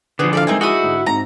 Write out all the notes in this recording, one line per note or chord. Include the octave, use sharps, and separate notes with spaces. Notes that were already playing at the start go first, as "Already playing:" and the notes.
D3 F3 B3 G#4
E3 D4 A4 D5 E5 F5
G#3 C4 D#4 A#4 E5 G#5
D#4 E4 F#4 G#4 D#6
G#2 D3
G#2 C4 A#5 A#6